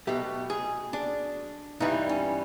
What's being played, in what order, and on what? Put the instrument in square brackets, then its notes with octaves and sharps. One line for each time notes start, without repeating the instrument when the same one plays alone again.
[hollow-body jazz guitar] B2 F#3 A3 G4
G#4
D4
G2 E3 G3 D#4
C#4